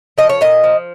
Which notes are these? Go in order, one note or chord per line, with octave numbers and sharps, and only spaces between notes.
F3 D#5
C#5
A#2 D#5
F3